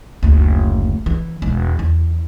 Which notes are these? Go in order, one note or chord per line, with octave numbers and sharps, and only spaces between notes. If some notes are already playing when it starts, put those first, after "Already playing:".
F#1 D2
E3
E1
E2